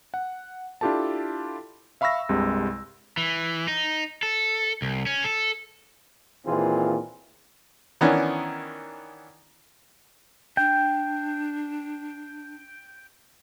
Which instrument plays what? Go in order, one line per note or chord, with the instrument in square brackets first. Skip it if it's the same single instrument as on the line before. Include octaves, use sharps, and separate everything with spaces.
[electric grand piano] F#5
D4 E4 F4 G4 A4 A5
E5 F5 B5 C#6 E6 A#6
C2 G2 C3 G#3
[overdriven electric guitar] E3
D#4
A4
C2
C#4
A4
[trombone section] D#2 A#2 E3 C4 F4 G#4
[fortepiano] D#3 E3 B3 C#4 D4
[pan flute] D4 [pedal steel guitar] G5